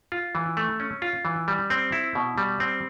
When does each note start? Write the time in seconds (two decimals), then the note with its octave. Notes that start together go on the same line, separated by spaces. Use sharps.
0.12 F4
0.35 E3
0.57 A3
0.80 C#4
1.02 F4
1.25 E3
1.48 G3
1.70 C4
1.92 E4
2.15 B2
2.38 G3
2.60 C4